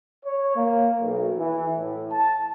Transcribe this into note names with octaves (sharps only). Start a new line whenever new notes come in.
C#5
A#3
B1
E3
A2
A5